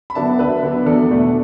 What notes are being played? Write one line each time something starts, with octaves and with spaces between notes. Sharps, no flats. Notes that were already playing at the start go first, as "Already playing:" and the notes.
B5
D3 F#3 B3 D4 E5 A5
D2 B4 E5
D3 F#3 B3 D4
E2 A4 D5
B2 A3 D4